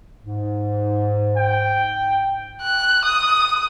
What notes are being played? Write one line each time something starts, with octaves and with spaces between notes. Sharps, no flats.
G#2
G5
F#6
D#6